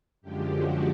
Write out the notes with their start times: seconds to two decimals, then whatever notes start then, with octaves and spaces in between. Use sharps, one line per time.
0.21 F#2 D3 F3 G#3 G4
0.53 F#4